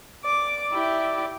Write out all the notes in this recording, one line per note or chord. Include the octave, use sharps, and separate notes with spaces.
D5 D6
E4 G4 E5